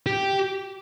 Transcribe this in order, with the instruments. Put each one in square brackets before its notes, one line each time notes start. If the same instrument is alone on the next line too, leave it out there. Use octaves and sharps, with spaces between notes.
[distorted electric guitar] G4